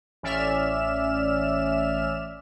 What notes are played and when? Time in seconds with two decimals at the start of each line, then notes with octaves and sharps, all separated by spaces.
0.23 A1 C#4 D5 E5 F6 E7